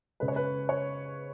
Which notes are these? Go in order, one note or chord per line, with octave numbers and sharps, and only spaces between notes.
C#3 G#3 C#4 B4
C#5
B4
C#5